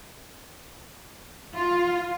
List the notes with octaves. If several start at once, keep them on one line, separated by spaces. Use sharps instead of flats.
F4